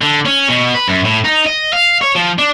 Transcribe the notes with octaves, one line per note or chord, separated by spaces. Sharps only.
D3
C#4
B2
B4
F#2
A2
D#4
D#5
F5
C#5
F3
D4